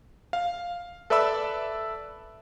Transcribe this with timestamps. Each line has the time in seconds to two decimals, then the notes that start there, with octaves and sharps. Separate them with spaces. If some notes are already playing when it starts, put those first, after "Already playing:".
0.33 F5
1.10 A4 B4 D5 E5 B5 E6